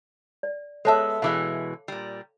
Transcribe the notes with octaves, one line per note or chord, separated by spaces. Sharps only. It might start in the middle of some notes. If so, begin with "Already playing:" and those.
D5
G#3 B3 A4 C#5 E5 A5
B2 E3 G#3 F5 D6
A#2 G3